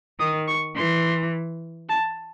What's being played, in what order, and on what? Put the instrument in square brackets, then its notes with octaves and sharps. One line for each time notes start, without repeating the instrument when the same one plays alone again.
[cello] D#3 [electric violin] D#6
[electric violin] C#6
[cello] E3 [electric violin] C6
[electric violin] A5